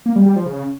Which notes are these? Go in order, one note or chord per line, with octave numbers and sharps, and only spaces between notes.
A#3
G3
G3
F3
C#3